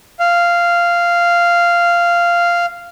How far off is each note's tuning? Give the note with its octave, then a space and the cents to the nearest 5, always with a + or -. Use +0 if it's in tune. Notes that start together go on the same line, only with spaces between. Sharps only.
F5 -10